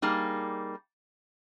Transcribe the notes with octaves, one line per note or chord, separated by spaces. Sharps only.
G3 A#3 D#4 G#4